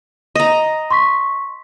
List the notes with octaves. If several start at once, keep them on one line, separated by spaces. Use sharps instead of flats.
D#5 A#5
C6 C#6 B6